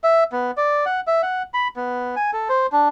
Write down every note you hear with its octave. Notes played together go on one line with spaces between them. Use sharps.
E5
B3
D5
F#5
E5
F#5
B5
B3
G#5
A4
C5
D4